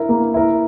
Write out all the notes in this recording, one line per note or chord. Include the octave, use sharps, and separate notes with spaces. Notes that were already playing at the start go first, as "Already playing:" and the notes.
Already playing: E4 A#4
A#3
E4 A#4